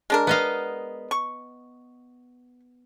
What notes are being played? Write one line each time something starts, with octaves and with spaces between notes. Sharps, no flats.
G#3 D4 A#4
B3 D#5 F5
C#6